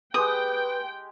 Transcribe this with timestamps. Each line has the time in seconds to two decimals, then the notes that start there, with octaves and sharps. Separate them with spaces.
0.14 G#3 G4 B4 G5 D#6